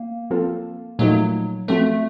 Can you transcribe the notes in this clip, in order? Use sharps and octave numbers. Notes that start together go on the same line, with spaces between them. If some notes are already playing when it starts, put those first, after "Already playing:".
Already playing: A#3
F3 C4 F4 A4
A#2 F3 F#3 A3 D#4 F#4
F3 A3 C4 F#4 A4